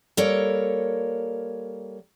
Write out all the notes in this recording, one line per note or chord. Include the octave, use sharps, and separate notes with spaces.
G3 A#3 A4 A#4 C#5